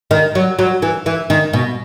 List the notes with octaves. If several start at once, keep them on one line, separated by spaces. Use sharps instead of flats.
D#3
F#3
F#3
E3
E3
D#3
B2